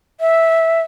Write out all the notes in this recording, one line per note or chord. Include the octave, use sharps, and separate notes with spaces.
E5